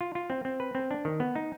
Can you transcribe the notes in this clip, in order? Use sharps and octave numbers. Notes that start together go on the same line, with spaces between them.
F4
F4
C4
C4
B4
C4
D4
D#3
B3
D#4